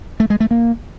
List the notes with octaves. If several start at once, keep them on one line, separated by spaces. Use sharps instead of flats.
A3
G#3
A3
A#3